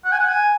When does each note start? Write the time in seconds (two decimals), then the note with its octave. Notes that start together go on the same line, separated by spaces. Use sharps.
0.05 F#5
0.12 G#5
0.20 F#5
0.28 G#5